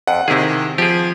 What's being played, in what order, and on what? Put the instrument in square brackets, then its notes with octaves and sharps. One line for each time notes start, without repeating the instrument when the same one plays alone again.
[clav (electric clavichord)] F2 [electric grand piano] F#5
[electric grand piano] C3 D#3 [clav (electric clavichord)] C4 E4 G#4
[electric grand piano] F3 [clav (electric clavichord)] G4 G#4